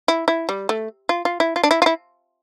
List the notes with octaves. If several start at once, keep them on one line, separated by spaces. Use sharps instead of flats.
E4
E4
G3
A3
F4
F4
E4
F4
D4
E4
F4
E4